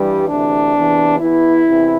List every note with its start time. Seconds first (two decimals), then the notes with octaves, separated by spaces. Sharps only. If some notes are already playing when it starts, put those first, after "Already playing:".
Already playing: G2 E3 G3
0.29 D2 C3 E3 D4
0.75 E2 C3 E3
1.19 E2 E3 E4
1.66 E2 C3 E3